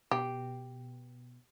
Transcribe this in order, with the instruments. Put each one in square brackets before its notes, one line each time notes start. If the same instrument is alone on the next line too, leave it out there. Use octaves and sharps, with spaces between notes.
[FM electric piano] B2 [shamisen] G4